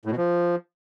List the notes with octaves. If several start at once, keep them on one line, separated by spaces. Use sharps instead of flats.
A2
B2
F3